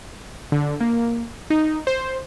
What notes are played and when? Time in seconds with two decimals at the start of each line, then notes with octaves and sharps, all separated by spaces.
0.52 D3
0.81 A#3
1.50 D#4
1.87 C5